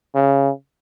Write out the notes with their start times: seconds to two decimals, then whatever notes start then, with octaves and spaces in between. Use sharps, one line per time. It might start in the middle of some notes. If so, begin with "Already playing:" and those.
0.15 C#3